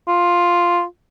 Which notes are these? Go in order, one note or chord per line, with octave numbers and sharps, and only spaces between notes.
F4